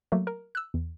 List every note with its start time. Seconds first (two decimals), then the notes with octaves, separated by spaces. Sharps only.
0.12 F#3 A3 A#3
0.27 A#4
0.55 E6 F#6
0.74 E2